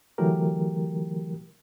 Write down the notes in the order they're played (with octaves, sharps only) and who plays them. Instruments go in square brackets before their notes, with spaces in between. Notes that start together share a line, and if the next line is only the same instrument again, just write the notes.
[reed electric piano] D3 E3 F#3 A3 G4 A#4